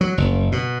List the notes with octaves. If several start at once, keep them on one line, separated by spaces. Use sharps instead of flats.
F#3
F#1
B2